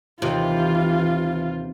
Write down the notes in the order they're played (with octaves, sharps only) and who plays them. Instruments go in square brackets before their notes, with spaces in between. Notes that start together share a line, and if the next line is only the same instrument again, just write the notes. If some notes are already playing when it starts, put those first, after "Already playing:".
[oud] D#2 C3 [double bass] E3 [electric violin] F4